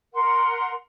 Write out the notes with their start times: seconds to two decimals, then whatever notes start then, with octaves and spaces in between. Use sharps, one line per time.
0.14 A#4 F#5 C6